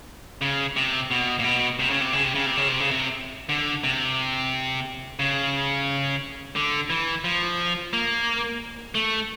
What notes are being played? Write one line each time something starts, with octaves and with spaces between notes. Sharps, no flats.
C#3
C3
B2
A#2
B2
C3
C#3
C3
C#3
C3
C#3
C3
C#3
C3
C#3
C3
D3
C3
C#3
D3
E3
F3
A#3
A3